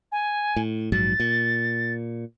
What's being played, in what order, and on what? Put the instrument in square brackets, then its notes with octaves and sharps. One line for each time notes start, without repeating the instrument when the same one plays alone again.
[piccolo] G#5
[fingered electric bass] A2
[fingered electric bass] A#1 G#2 F#3 [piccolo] A6
[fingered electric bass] A#2